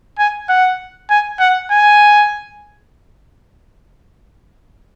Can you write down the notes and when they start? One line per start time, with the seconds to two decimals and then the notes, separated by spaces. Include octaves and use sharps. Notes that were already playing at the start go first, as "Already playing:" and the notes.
0.19 G#5
0.49 F#5
1.10 G#5
1.40 F#5
1.71 G#5